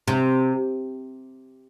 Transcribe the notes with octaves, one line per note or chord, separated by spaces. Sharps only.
C3